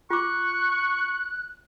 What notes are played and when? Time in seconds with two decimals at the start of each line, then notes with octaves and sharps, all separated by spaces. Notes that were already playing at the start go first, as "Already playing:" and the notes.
0.10 F4 C#6 D6 F#6